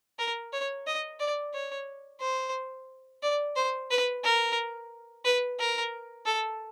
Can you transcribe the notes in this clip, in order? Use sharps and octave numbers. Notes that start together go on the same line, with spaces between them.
A#4
C#5
D#5
D5
C#5
C5
D5
C5
B4
A#4
B4
A#4
A4